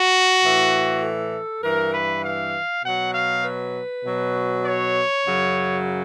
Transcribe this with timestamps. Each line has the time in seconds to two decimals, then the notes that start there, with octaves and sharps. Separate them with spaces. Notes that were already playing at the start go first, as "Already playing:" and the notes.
Already playing: F#4
0.42 A2 E3
1.03 A4
1.62 G2 E3 A#4
1.93 B4
2.24 F5
2.83 B2 F#3 F#5
3.13 F5
3.44 B4
4.04 B2 F#3
4.65 C#5
5.26 F#2 C#3 F#3